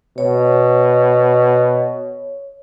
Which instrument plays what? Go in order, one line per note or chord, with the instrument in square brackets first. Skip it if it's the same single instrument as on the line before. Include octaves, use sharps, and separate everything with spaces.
[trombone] B2 [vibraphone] C#5